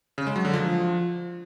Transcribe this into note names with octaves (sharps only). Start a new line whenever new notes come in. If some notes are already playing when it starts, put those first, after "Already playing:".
C#3
G#3
F#3
D3
F3